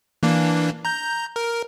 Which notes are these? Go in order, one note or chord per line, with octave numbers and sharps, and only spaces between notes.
E3 A#3 D4
A#5 G6
A#4